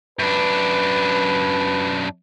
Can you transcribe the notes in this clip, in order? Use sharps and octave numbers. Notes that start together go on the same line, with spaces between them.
F#2 D4 B4